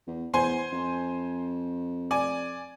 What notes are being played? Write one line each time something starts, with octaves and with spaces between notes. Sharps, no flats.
E2
E2 C5 G#5 C6
F2
D5 G#5